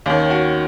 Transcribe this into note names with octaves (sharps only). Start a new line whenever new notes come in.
D#2 D#3 C#4
F#4